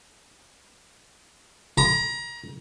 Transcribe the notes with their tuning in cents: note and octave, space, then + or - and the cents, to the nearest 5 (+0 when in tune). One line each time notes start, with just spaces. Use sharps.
A#5 +30